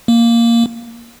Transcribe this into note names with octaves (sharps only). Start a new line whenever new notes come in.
A#3